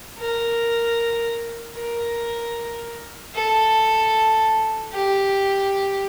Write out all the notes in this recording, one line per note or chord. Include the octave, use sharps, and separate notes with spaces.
A#4
A#4
A4
G4